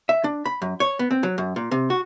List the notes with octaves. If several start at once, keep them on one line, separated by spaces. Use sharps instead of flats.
E5
D4
B5
F#2
C#5
B3
C4
F#3
F#2
A#2
C3
F#4